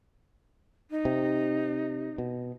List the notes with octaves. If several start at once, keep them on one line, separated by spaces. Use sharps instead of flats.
D#4
C3
B2